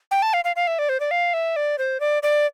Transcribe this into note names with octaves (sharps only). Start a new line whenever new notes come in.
G5
A5
F5
F5
F5
E5
D5
C5
D5
F5
E5
D5
C5
D5
D5